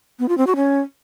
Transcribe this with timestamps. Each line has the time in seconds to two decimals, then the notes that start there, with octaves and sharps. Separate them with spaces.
0.19 B3
0.29 F4
0.38 C4
0.47 F#4
0.56 C#4